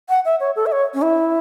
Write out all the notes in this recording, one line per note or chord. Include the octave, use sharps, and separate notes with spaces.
F#5
E5
C#5
A4
E5
C#5
C#4
E4